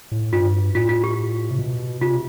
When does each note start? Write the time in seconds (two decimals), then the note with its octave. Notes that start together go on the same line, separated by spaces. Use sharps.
0.11 A2
0.33 G2 F4
0.75 A2 F4
0.89 F4
1.04 G4
1.51 C3
1.59 B2
2.01 C3 F4